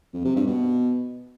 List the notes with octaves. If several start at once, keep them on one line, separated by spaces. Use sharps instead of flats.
F2
C3
G2
B2